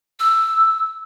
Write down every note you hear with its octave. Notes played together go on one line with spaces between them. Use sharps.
E6